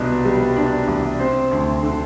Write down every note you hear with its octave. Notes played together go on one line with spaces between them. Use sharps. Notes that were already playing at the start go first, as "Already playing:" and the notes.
Already playing: C2 B2 D4
G3
D4
C2
C4 C5
D2
D3